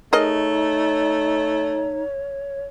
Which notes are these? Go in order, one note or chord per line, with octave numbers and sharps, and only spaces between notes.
A3 D#4 G#4 A#4 C#5 D#5